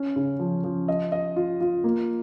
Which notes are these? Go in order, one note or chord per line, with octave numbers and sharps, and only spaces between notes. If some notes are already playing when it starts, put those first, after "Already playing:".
Already playing: C#4
C#3
F3
F3
D#5
D#5
F4
F4
A#3